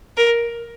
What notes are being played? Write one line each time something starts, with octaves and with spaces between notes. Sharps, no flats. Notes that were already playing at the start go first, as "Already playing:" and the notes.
A#4